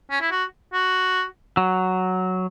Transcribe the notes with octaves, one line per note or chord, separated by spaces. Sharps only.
C#4
E4
F#4
F#4
F#3